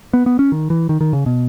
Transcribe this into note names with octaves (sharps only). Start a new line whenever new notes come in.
B3
B3
C#4
D#3
E3
D#3
D#3
C#3
B2